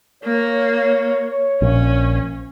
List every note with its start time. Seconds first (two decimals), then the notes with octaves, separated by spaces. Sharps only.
0.24 A#3 C#5
1.62 A#1 C#4